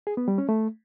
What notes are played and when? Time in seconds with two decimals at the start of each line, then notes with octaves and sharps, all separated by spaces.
0.07 G#4
0.17 B3
0.28 G3
0.38 C#4
0.49 A3